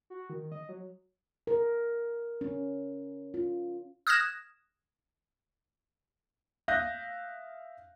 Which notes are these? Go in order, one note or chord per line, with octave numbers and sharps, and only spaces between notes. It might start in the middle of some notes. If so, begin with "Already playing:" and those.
F#4
D#3
D#5
F#3
A#4
C#4
F4
D#6 F6 F#6 G#6 A#6 E7
E5 F5 D#6 F#6 G6 A#6